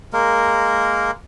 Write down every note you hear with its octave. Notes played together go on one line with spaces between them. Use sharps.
G#3 A#3 A#4